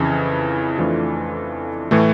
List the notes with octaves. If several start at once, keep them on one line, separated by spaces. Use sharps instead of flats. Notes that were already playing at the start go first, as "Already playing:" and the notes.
Already playing: F2 C#3 E3
F2 E3 A3 D4 F4
A2 E3 A3